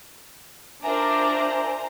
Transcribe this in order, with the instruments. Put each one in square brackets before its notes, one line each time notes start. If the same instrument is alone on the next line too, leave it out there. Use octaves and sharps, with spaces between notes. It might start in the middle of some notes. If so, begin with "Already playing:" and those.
[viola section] D4 F4 A#4 [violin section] C5 A#5 [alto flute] E5 [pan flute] G#5